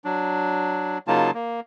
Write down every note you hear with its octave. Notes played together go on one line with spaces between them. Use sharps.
F#3 D4
C#3 F#3 A#3 D#4 F4 A5
A#3